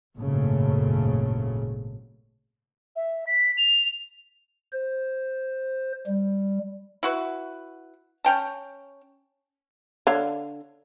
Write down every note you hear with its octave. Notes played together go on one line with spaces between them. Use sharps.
G#1 F#2 A#2 C#3 A3
E5
B6
F7
C5
G3
E4 F#4 B4
C#4 G5 A5
D3 C#5 F5